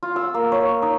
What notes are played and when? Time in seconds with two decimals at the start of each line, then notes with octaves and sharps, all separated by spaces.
0.03 F4
0.16 E6
0.34 A#3
0.52 C#5
0.82 D#4